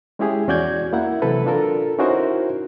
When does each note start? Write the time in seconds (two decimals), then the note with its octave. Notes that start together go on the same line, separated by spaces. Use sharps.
0.19 G#3 C#4 E4 G4 G#4
0.48 E2 C#4 F#4 D5 G6 G#6
0.93 A#3 E4 F#5
1.22 C3 E3 F#3 A4 B4
1.46 D4 F4 A4 A#4
1.99 C#4 D#4 E4 F#4 A#4 C5